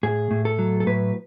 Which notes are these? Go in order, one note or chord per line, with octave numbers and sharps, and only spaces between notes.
A2 G#4
A2
A4
F#3
A4
A2 B4